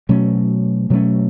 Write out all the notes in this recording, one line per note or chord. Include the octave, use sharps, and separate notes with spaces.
B2 F#3 A3 C#4
B2 F#3 A3 C#4